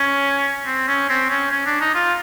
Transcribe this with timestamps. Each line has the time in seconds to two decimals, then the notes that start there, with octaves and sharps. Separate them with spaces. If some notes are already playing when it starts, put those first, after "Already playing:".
Already playing: C#4
0.66 C4
0.88 C#4
1.09 C4
1.30 C#4
1.51 C#4
1.66 D4
1.81 D#4
1.95 F4